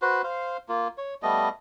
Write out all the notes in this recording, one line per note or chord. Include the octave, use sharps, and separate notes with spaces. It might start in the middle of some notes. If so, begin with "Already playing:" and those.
F#4 B4 C5
C5 F5
A#3 F4
C#5
G3 A3 B3 D#5